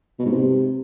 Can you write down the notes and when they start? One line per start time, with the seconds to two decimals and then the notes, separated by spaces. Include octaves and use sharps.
0.19 B2
0.26 G#2
0.32 C3